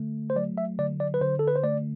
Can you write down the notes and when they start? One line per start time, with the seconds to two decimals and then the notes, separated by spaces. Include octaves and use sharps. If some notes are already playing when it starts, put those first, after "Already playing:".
Already playing: D3 A3
0.30 C5
0.36 F#3 D5
0.58 E5
0.79 D3 D5
1.00 D5
1.14 B4
1.21 D3 C5
1.39 A4
1.48 B4
1.56 C5
1.64 A3 D5